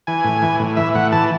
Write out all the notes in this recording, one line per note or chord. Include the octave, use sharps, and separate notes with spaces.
E3 G#5
A2
E3
A2
E3 E5
A2 F#5
E3 A5